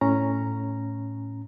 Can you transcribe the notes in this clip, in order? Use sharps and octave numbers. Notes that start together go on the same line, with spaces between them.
A2 C#4 A#5